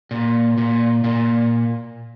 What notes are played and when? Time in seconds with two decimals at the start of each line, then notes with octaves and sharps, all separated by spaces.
0.11 A#2
0.58 A#2
1.04 A#2